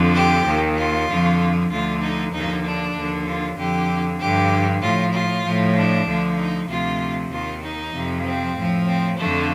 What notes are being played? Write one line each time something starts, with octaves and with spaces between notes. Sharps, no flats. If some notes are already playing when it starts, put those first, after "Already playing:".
Already playing: F2 D3 F3
G4
D#2 D#3
F4
F2 D3 F3
D2 D3 F3 F4
D#4
D#2 D3 F3 D#4
D4
D#2 D3 F3
F4
F2 D3 F3 G4
G2 D3 F3 G4
A2 F3 F4
F4
A2 F3
D4
D2 D3 F3
D#4
D2 C3 F3 F4
D#2 D#3 F4
D#4
F2 C3 F3
C4
A2 F3
C4
F2 D3 F3 A3